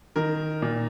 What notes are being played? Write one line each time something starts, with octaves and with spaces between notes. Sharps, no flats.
D#3 A#4
A#2